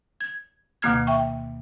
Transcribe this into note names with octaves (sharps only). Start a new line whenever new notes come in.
G#6
D2 B2 D#3 A#3 F6 G#6
E5 G5 C#6